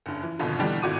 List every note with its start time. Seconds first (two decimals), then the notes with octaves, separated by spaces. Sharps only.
0.06 F#1 G2
0.23 E3
0.39 G#1 D2 G2 B2 D3 F3
0.59 E2 B2 D3 E3 G3 D4
0.82 G#1 A2 F#4 D6 D#7